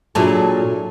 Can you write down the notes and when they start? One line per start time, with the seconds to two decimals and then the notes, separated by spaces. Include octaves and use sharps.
0.15 A#2 F#3 D4 E4 G#4 A4